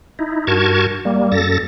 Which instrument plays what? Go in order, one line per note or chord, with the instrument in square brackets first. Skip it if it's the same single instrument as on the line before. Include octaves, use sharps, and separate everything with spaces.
[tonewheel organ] D#4 E4
G2 F#4 A#4 A5 C#6 G#6
G3 A#3
F#2 A4 A6 A#6